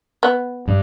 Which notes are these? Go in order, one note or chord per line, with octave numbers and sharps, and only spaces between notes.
B3
G2 G3